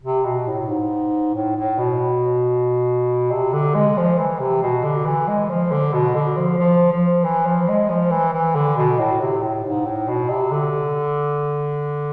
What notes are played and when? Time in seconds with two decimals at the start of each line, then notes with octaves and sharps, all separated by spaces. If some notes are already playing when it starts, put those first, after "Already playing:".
0.03 C3
0.25 B2
0.47 A2
0.69 G#2
1.34 A2
1.56 A2
1.78 B2
3.31 C3
3.53 D3
3.75 G#3
3.97 F3
4.18 E3
4.40 C3
4.62 B2
4.83 D3
5.06 E3
5.28 G#3
5.49 F3
5.71 D3
5.93 B2
6.15 D3
6.37 F3
6.58 F3
6.92 F3
7.24 E3
7.46 F3
7.68 G#3
7.89 F3
8.11 E3
8.33 E3
8.55 D3
8.77 B2
8.99 A2
9.20 C3
9.42 A2
9.64 G#2
9.86 A2
10.08 B2
10.29 C3
10.52 D3